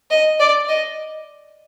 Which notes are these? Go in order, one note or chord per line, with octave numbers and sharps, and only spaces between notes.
D#5
D5
D#5